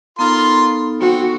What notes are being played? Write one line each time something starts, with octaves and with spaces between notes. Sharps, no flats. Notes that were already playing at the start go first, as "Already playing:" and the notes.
B3 D#4 F4 A4 A#4 C6
C4 F#4